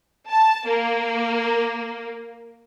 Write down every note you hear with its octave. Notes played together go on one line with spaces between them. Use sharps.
A5
A#3